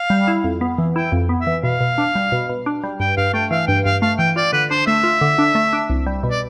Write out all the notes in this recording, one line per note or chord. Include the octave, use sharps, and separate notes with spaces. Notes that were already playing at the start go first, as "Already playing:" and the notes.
Already playing: F5
G3
E4
F2
B3
E3
E4 G5
F2
B3
E5
E3
B2 F5
B2
D4
G3
B2
B2
D4
G3
G2 G5
G2 F5
A3 G5
E3 F5
G2 G5
G2 F5
A3 F5
E3 G5
F4 D5
D3 B4
D4 C5
A3 E5
F4
D3
D4
A3
D4
C2
G3
B2
D5